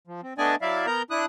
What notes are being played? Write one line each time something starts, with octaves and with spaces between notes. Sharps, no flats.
F3
C4
A3 B3 D4 D5 D#5 G#5
F#3 E4 D5 E5 F5
B3 A#4 A#5 G6
D4 E4 D#6 F#6